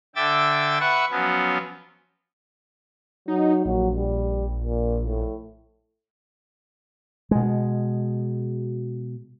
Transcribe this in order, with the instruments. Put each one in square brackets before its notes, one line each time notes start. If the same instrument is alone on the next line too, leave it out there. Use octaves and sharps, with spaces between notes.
[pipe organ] D3 E5 G5 D6 E6 A6
B4 E5 F#5 C#6
F3 F#3 B3 C#4
[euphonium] F#3 [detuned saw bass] D#4
[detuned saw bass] A#1 [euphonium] F#3
[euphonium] G3
A#2
A2
[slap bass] B2 G#3